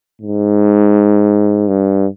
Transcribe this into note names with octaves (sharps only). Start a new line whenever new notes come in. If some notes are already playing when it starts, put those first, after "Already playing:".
G#2
G2